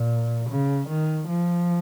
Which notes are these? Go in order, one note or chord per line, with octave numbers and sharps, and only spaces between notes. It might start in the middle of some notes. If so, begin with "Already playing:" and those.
Already playing: A#2
C#3
D#3
F3